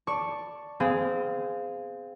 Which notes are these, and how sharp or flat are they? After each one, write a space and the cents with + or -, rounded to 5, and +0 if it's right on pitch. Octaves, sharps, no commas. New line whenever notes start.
D5 +0 A5 +5 C#6 +0
C4 -25 G#4 +0 F5 +0